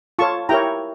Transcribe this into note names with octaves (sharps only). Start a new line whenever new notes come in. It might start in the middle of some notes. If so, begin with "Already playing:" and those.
F4 A4 C#5 A5 C#6
E4 G4 A#4 C#5 G5 A#5